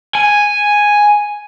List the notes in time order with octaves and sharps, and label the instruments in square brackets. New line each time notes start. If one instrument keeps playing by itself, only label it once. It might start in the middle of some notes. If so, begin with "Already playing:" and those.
[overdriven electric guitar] G#5